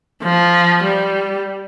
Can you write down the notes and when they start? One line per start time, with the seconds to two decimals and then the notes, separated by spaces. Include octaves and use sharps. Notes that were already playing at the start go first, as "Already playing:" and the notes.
0.22 F3
0.83 G3